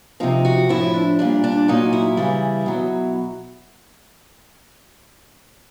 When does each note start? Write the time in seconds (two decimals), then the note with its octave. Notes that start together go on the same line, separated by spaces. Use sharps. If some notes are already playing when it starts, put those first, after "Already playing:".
0.20 C3 F3 D#4
0.45 F#4
0.69 A2 F3 E4
0.94 D4
1.19 A#2 G3 D4
1.44 D4
1.68 A#2 F#3 D#4
1.93 E4
2.17 C#3 E3 G3
2.66 B2 F#3